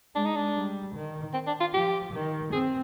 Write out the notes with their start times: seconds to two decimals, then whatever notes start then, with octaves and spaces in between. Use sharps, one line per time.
0.15 G#3 D4
0.26 D#4
0.36 D4
0.55 G3
0.95 D#3
1.34 C4
1.47 D4
1.60 F4
1.73 F3 G4
2.13 D#3
2.52 C4 G#4